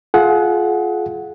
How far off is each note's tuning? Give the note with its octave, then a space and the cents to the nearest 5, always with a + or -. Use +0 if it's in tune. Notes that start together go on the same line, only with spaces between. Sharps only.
F4 +0 G#4 +35 F#5 +0